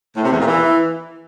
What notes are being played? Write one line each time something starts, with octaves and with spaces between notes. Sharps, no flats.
A2
C3
E2
A#2
E3